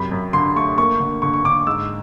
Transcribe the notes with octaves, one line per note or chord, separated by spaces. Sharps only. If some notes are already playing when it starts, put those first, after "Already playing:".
Already playing: F#2 C3 B5
F#2
D3 C6
A3 C#6
A#3 C#6
D3
D3 C#6
C#6
D3 D6
G#2 E6